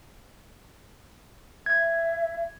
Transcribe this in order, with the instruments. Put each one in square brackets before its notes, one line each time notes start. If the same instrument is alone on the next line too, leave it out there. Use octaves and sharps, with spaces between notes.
[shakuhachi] E5 [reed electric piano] G#6